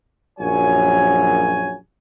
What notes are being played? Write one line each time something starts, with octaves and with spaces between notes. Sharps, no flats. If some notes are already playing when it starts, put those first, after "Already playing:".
A#1 F#2 F#3 C#5 G#5